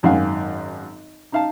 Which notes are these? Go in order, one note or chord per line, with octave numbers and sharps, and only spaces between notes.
G#1 F#2 D#3 F5 F#5 G#5
D#4 F5 A5